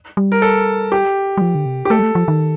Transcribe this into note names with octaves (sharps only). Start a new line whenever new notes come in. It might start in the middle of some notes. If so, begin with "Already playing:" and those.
G3
A#4
A4
G4
G3
F3
D3
C3
G4
A3 A4
G3
A3
F3
D#3